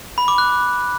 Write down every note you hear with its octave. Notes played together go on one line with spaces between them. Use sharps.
B5
D6
F#6